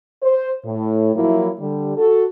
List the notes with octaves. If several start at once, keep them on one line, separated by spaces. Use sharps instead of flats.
C5
A2
F3 F#3 A#3 E4
D3 G3
F#4 A4